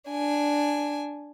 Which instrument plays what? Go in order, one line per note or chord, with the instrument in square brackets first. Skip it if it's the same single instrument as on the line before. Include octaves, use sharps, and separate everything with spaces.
[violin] D4 G#5